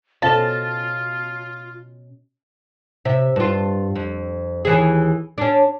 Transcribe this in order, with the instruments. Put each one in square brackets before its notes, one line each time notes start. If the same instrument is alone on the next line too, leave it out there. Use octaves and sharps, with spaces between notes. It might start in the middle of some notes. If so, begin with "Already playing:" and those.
[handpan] B2 C#4 D#5 [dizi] F4 [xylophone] A4 C5 F5 [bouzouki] A5
[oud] C3 E5
G2 F4
F2
D#2 E3 G#4
C#4 D4